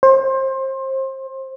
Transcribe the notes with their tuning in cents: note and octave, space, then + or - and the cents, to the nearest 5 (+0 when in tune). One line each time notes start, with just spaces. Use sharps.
C5 +25